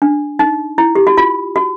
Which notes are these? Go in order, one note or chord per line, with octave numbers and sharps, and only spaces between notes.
D4
D#4
E4
G4
F#4
F4
F#4